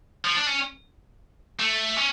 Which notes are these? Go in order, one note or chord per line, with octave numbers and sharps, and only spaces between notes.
F3
D4
C#4
A3
C#4